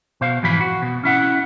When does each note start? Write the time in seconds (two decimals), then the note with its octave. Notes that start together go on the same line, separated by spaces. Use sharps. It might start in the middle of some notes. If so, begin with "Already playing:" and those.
0.21 B2 C5 F5
0.43 F2 G#2 E3 F3 B5
0.60 F#4
0.82 B2
1.04 C#4 E4 F#5